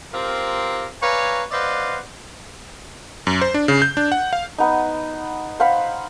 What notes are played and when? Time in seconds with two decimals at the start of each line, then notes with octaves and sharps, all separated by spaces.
0.12 C4 F4 G4 A#4
1.01 B4 C#5 D5 F5 G#5 A#5
1.52 B4 C5 D5 D#5 F5 F#5
3.27 F#2
3.42 C5
3.54 D4
3.68 C#3
3.82 G6
3.97 D4
4.12 F#5
4.33 F5
4.58 B3 D#4
5.60 C5 F5 F#5 B5